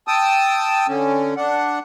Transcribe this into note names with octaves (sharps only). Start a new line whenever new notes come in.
G5 A5 D#6 E6
D3 C#4
D4 F#5